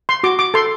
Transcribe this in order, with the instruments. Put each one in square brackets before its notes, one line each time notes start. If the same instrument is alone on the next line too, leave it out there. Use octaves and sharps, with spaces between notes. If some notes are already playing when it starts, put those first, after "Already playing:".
[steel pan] C6
F#4 D6
D6
A4 C6